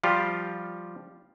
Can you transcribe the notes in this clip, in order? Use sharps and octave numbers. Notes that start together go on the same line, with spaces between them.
F3 G3 F4 G4